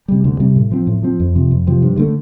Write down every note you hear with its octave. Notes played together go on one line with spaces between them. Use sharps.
C3 G3
D2
C3 G3
A2
F3 C4
A2
F3 C4
F2
C3 F3
F2
C3 F3
G2
D3 A3